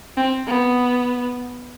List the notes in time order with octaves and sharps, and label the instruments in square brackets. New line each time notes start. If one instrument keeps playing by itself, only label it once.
[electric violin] C4
B3